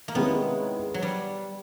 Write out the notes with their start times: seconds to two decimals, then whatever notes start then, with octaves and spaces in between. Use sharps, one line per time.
0.08 A#3
0.15 C3 D#3 G#3 B3 C#4 E4
0.94 F#3
1.02 G3